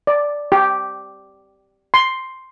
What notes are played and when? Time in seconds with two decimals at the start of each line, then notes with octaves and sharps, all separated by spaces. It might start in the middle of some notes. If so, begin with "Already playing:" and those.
0.07 D5
0.52 G4
1.94 C6